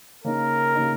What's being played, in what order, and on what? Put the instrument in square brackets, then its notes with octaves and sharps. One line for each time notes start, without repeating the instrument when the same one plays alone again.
[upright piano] C#3 A#3 D#4 [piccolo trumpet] A#4
[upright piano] C#3 A#3 D#4